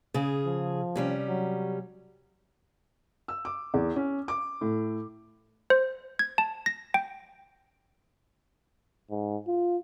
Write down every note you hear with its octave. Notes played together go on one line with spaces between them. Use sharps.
C#3 G#4
F3
C3 G3 C#4
F#3
E6
D6
E2
C#4
D6
A2
C5
G#6
A5
A#6
G5
G#2
F4